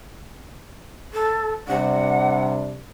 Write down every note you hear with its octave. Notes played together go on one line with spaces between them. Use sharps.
A4
C3 G3 D4 F#5